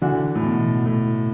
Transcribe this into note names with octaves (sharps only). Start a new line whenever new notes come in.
D3 E3 D4 F#4
A2
B2
A2